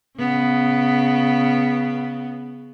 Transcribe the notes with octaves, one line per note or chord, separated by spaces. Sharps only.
C#3 B3